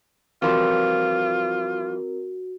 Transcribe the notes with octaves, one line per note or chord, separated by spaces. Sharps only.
E3 F3 G3 C4 F4 F#4 A#4